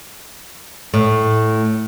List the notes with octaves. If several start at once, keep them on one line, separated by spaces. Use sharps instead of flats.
A2